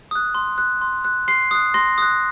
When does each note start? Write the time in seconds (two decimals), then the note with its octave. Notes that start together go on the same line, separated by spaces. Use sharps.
0.11 D#6 F#6
0.35 C6
0.58 F#6
0.81 C6
1.05 F#6
1.28 C6 C7
1.51 D#6 F#6
1.74 C6 A#6
1.98 D#6 F#6